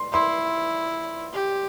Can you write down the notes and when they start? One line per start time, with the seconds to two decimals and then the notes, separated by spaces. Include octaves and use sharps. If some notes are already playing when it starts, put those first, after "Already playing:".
Already playing: C6
0.13 E4 C6
1.33 G4